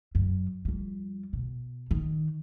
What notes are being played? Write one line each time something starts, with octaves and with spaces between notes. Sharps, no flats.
F#2
F2 G3
B2
D#3